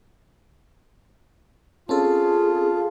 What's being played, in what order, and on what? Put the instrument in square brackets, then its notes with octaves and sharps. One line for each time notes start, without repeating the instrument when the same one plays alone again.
[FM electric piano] C4 C#4 A4 [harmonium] F4 [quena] G#4 [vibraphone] A5